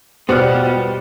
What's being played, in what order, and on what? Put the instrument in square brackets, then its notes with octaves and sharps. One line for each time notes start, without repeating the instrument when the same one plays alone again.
[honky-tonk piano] B2 F6 [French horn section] G3 [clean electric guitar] B3 D5 F#5 [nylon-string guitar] F4 C5